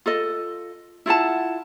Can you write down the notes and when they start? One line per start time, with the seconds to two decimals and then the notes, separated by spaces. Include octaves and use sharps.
0.06 F4 A4 D#5
1.06 E4 F4 F#5 A5